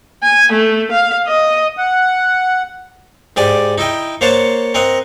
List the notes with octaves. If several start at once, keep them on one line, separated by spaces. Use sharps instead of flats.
G#5
A3
F5
D#5
F#5
G#2 G4 D5 G#5
D#4 E4 D#5 G5
A#3 C5 C#5 F#5 A5
C4 A#4 D#5 F#5